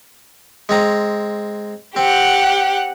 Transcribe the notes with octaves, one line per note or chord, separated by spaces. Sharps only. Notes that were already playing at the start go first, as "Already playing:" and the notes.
G#3 C4 A#5
C4 G4 F#5